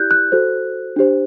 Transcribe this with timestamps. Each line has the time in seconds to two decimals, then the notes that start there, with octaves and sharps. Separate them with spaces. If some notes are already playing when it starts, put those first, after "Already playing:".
Already playing: E4 G4 D5 F#6 G6
0.11 F#6
0.32 F#4 A4 C5
0.96 D4 G4 C5